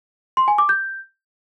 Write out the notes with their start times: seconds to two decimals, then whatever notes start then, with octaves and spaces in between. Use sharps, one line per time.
0.37 C6
0.48 G#5
0.58 D6
0.69 G6